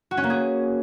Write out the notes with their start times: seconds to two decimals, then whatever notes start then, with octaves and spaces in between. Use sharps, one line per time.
0.11 F#4
0.17 C#4
0.24 A#3
0.30 G#4